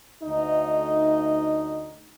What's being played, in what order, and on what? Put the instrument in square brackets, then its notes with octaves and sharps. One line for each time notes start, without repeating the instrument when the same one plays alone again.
[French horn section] D2 D#4 D#5